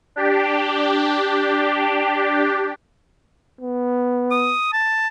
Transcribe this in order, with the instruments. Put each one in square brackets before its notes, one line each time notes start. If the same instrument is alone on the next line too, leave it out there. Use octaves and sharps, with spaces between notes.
[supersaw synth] D4 G4
[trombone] B3
[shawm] D#6
A5